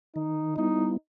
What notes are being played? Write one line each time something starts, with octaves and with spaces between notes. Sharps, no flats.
D#3 D#4
G3 B3 D#4 E4